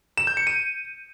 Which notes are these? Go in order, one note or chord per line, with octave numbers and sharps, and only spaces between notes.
E7
G6
C#7
D#7